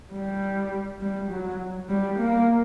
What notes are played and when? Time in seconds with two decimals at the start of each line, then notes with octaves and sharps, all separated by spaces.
0.12 G3
1.01 G3
1.31 F#3
1.89 G3
2.19 A#3